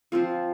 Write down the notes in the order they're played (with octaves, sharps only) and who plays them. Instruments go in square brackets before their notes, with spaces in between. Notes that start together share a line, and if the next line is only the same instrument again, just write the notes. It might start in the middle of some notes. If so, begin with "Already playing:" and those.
[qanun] F3 C4 F4